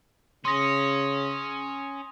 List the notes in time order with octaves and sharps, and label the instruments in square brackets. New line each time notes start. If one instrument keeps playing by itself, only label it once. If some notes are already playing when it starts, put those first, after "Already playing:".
[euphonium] C#3 [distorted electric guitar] C#4 [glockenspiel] C6 D#6 A#6